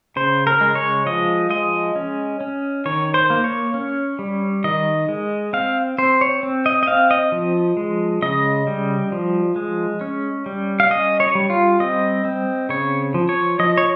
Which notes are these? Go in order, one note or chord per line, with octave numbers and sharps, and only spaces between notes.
C#3 C5
A#4
G#3
C#5
F3 D#5
G#3 D#5
C#4
C#4
D#3 C#5
C5
A#3
C#5
C#4
G3
D#3 D#5
G#3
C4 F5
C4 C5
C#5
C4
D#5
D#5
C4 F5
D#5
F3
G#3
C#3 D#5
G3
F3
G#3
C#4
G3
F5
C#4 D#5
C#5
G3
F4
C4 D#5
C4
C#3 C#5
F3
C#5
F3 D#5
C#5